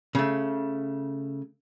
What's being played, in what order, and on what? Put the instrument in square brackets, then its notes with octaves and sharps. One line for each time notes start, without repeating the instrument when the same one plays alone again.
[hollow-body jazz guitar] C#3 A3